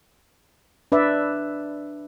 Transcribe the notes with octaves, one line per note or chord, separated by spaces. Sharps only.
D4 B4 D5 E5